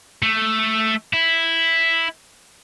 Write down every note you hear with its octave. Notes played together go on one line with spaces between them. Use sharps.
A3
E4